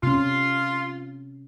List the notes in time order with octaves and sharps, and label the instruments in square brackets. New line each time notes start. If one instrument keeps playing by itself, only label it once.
[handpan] C3 C#4 [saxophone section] F4